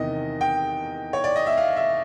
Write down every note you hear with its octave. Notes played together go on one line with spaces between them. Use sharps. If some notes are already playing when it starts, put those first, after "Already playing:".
Already playing: E2 C3 D#3 D#5
G5
C#5
D5
D#5
E5
F5
E5